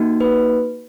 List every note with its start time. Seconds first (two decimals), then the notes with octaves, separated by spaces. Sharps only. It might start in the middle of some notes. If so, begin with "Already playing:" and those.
Already playing: A#3 D#4 F#4
0.21 B4